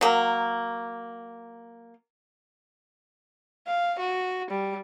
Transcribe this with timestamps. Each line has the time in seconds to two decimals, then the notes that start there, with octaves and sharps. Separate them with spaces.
0.01 F#3 A#3
3.67 F5
3.99 F#4
4.50 G3